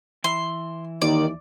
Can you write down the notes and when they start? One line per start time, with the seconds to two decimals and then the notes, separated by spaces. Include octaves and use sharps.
0.24 E3 E4 E5 C6
1.02 D#2 D#3 D5